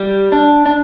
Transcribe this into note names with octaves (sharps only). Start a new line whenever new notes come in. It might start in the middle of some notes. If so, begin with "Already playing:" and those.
Already playing: G3
D4
D4